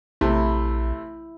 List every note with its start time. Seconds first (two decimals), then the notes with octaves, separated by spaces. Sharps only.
0.21 A#1 C3 A3 E4